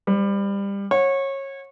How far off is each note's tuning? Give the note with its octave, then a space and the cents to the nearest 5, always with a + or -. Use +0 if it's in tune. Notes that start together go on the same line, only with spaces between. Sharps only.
G3 +25 C5 -15
C#5 -25 F#5 -25